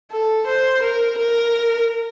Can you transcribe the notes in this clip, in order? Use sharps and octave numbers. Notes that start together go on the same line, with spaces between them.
A4
C5
A#4
A#4